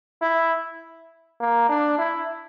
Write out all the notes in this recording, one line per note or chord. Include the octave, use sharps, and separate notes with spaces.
E4
A#3
D4
E4